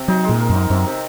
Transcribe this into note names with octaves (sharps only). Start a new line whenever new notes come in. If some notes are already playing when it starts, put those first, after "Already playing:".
Already playing: C3
F#3 D#4
A#2 G#3
A#4
F#2
D#4
F#2 C3
C3